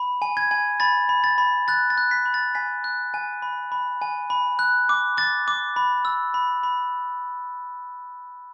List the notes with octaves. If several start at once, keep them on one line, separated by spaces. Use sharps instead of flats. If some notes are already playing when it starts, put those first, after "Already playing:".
Already playing: B5
G#5
G#6
G#5
B5 A6
B5
A6
B5
F#6 A6
A6
F#6
B6
B5
A6
G#5 B6
F#6
G#5
B5
B5
G#5
B5
F#6
D6
D6 A6
D6
B5
E6
B5
B5